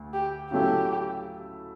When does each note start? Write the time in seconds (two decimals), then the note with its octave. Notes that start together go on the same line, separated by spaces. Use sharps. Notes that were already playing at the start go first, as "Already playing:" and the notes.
Already playing: D2
0.14 G4
0.51 C#3 F#3 A3 E4 G4 A4